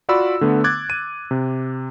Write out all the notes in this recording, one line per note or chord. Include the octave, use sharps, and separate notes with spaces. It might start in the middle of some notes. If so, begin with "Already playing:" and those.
F4 F#4 D5 B5 E6
D3 A3 B3
D6 F#6 G#6 A6
D#7
C3